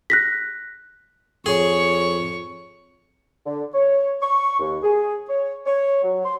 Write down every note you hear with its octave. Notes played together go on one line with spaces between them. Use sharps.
F#6 A#6 B6
F2 G#4 C#5 C#6
D3
C#5
C#6
D#2
G#4
C#5
C#5
F#3
C6